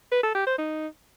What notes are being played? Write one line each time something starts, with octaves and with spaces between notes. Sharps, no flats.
B4
A4
G4
C5
D#4